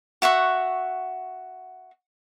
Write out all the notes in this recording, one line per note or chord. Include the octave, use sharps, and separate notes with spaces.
F#4 E5 F#5 C#6